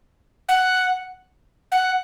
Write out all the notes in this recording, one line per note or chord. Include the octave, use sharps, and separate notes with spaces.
F#5
F#5